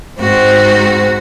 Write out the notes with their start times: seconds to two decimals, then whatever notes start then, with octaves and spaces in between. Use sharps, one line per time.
0.20 G#2 C4 F#4